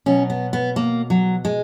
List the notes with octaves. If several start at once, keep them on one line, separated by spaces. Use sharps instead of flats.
B2 F#3 C#4
B3
B3
A#3
F#3
G#3